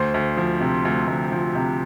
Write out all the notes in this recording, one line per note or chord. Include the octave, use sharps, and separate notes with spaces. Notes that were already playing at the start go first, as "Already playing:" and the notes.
Already playing: D2 C5 C6
D2
F3
C3
D2
D2
F3
C3